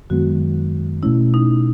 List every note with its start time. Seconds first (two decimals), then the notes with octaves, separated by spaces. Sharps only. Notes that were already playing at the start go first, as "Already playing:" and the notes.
0.10 F#2 D#3 G#3 B3 F#4
1.03 B2 A3 C#4 E4
1.34 D#4